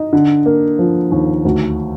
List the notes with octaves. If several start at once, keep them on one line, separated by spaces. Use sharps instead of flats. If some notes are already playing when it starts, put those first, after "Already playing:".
Already playing: D#4
D3
A#3
F3
D#2
D2